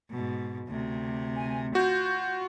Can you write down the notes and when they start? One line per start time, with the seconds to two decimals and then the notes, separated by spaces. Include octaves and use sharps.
0.10 G#2 B2
0.67 D2 C3
1.35 G#5
1.75 F4 F#4 G6